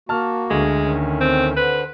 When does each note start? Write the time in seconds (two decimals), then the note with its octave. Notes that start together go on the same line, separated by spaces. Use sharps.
0.09 A#3 F#4 A5 F6
0.50 D2 D3 G#3
0.83 D#3 C#4
1.21 C4
1.57 D3 B4 C5